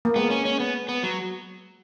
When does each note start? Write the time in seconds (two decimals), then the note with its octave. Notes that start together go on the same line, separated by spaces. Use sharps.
0.05 A#3
0.16 G#3 B3
0.31 C#4
0.45 C#4
0.60 B3
0.89 B3
1.03 F#3